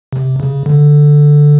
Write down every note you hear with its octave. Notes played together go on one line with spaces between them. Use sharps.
C3
C#3
D3